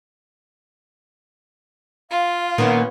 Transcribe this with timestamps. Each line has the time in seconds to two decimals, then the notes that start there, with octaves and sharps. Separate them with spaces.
2.11 F4 F5
2.58 A#2 D#3 A#3 B3 C#4 F#5